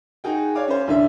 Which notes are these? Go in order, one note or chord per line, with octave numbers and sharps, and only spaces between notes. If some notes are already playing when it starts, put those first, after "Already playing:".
D#4 F#4 G#4 G5
C#5 D5 F5 D6
C#4 C5
C2 D3 D4 E5